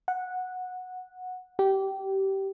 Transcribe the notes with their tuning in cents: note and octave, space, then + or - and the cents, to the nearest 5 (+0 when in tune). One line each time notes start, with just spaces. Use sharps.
F#5 -10
G4 -20